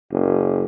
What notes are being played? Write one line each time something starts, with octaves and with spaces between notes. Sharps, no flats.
F#1